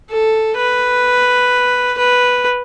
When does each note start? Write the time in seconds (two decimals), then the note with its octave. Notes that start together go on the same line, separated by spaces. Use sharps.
0.10 A4
0.57 B4
1.97 B4